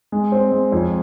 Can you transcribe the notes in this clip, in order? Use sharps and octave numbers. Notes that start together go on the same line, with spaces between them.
G#3
C4
G#3
F2